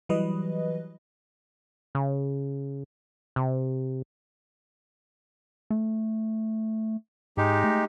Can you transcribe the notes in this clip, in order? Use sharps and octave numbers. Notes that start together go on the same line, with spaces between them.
E3 F#3 G3 B4 D#5
C#3
C3
A3
G#2 G#3 D#4 G4
A3